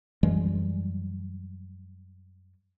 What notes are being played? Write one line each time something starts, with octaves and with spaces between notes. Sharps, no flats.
F#2 E3 G3 G#3